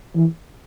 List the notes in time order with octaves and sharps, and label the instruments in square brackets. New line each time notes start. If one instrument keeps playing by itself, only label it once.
[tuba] E3